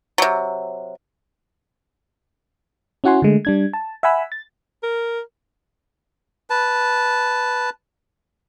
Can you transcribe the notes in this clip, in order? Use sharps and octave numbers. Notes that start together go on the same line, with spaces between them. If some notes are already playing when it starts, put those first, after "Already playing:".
C3 F#3
C#4 E4 F#4 F#5 G#5 C6
D3 G#3 A3
G3 D4 G#6
A5
E5 F#5 G#5 B5 E6
A6
A#4
B4 A5